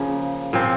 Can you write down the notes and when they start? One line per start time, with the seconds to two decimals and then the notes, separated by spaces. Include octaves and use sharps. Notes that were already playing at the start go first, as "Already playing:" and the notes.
Already playing: C#3 F3 A#3
0.53 A#2 F3 C4